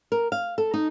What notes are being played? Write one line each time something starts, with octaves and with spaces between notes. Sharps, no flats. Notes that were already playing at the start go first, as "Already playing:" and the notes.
A#4
F5
A4
D#4